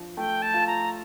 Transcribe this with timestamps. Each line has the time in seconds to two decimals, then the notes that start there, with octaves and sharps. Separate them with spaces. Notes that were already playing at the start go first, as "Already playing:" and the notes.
Already playing: F3 D4
0.17 A3 G5
0.42 A5
0.54 F4
0.67 A#5